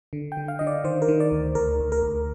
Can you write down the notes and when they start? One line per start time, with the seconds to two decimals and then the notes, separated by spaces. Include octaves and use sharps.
0.13 D3
0.32 G5
0.37 D3
0.48 F5
0.59 D3 D#5
0.67 D5
0.84 D#3 C5
1.02 A#4
1.08 D#3
1.20 D5
1.32 D2
1.55 D2 A#4
1.80 D2
1.92 A#4
2.03 D2